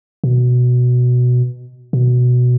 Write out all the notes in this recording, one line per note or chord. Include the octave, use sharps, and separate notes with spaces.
B2
B2